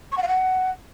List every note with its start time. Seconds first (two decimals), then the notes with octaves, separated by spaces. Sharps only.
0.12 C#6
0.17 F#5
0.23 F5
0.28 F#5